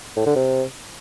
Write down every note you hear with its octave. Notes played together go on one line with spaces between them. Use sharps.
A2
D3
C3